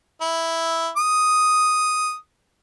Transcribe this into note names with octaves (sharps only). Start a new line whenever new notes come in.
E4
D#6